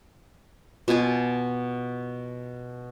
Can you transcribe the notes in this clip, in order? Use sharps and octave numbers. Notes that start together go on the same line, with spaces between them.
B2 F4 G#5 D6